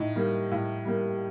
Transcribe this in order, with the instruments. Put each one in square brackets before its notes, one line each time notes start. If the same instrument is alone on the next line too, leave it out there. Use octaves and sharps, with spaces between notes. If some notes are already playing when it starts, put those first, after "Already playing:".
Already playing: [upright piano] A2 D#4
G3 A#3
A2
G3 A#3